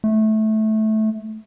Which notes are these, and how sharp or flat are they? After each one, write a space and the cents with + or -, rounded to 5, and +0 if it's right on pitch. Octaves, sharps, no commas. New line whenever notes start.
A3 -15